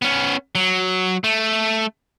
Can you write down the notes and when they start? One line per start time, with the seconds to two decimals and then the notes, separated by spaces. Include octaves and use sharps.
0.02 B3 C#4
0.55 F#3
1.24 A3